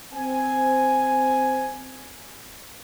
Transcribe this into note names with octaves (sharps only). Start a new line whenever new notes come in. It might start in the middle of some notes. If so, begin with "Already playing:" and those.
C4 G#5